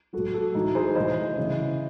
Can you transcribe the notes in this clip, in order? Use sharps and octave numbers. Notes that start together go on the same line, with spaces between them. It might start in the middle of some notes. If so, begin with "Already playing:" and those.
A2 F#3 F#4 A4
F#4 A4
A2 E3 D#4 F#4
G#4 C5
A2 E3 C5 D#5
C#3 E3